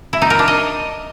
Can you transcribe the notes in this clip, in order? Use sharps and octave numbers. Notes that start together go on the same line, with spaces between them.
E4
D#4
A#4
D4
D#5